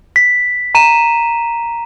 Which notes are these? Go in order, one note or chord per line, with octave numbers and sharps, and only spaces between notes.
B6
A#5 D#7 E7